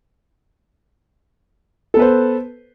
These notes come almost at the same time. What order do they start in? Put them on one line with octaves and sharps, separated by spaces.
A4 B3 B4 C5